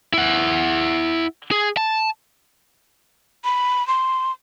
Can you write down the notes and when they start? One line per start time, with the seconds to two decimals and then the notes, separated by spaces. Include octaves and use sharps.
0.14 E4 F#5
1.51 G#4
1.77 A5
3.45 B5
3.88 C6